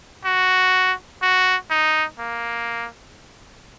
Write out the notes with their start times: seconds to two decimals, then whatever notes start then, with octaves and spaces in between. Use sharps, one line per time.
0.25 F#4
1.22 F#4
1.70 D#4
2.19 A#3